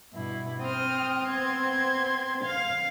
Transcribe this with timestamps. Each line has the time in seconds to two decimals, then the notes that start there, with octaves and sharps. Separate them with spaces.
0.14 G2 B2 E4
0.61 C4 G5 D#6 F6
1.28 B3 C6 G#6
2.45 F5